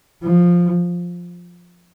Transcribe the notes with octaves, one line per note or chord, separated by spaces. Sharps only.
F3